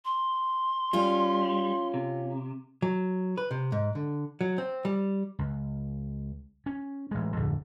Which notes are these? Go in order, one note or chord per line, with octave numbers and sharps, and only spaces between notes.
C6
G3 C#4 F4
C3
F#3
B4
C3
G#2
D3
F#3
C4
G3
C#2
C#4
A1 G#3
D1 F2 D3